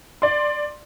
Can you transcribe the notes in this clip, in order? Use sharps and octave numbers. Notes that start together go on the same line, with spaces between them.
D5 C6